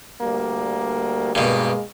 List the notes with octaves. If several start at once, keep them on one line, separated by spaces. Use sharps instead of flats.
D2 G3 A#3
G2 B2 G#3 A#3